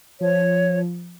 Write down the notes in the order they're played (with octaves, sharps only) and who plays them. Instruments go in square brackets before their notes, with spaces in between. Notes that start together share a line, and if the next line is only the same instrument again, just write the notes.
[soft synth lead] F3 [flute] C#5